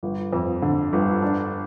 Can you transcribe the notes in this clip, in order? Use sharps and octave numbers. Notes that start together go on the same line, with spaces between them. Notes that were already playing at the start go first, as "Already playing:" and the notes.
G1
F2
D3
G1
D4